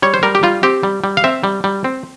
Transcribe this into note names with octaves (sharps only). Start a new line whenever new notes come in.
G3 C#5
C5
G3 A#4
G4
G3 F4
C4 G4
G3
G3
F5
C4 E5
G3
G3
C4